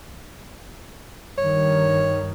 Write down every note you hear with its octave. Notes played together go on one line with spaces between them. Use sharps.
G2 D#3 C#5